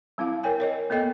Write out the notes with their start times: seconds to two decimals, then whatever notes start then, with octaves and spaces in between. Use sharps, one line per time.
0.18 G3 C4 E4 F5
0.43 A#4 C#5 G5 G#5
0.60 A#4 C#5 D#5
0.90 A#3 B3 A4 D#5 G5